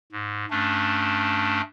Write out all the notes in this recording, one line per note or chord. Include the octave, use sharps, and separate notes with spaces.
G#2
G2 A3 C#4 D4